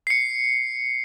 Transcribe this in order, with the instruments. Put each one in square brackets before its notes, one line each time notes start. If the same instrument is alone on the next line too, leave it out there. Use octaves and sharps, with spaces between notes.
[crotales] C7 C#7